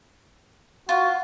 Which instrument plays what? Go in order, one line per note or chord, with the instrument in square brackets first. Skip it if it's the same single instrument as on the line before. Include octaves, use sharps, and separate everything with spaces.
[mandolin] F4 [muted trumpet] F#4